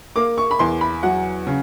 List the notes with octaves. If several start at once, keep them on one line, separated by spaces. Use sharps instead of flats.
A#3 D6
C#6
B5
E2 C6
B5
F#3 F#5
C#3